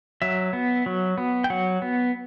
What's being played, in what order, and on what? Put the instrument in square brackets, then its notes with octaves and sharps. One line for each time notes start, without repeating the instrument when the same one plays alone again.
[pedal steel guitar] F#3 E5
B3
F#3
B3
G5
F#3 F#5
B3